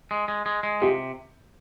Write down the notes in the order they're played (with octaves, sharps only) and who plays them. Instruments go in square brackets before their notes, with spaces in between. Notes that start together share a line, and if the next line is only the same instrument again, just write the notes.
[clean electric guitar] G#3
G#3
G#3
G#3
[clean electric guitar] C3 [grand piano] F4 G4